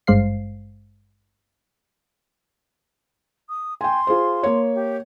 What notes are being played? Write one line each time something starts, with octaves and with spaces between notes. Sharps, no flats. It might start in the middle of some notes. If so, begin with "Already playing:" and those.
G#1 G2 G#3 C5 F5 C7
D#6
G5 G#5 C6
F4 G#4 C5
A#3 C#5
G4